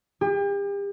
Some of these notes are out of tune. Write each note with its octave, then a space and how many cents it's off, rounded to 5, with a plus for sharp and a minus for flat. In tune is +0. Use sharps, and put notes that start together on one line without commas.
G4 +40